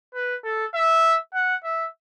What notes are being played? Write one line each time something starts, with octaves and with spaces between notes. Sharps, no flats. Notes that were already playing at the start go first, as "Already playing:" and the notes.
B4
A4
E5
F#5
E5